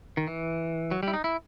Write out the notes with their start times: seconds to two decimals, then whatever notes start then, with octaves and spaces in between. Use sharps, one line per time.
0.17 D#3
0.27 E3
0.91 F#3
1.03 G3 E4
1.14 D#4
1.24 E4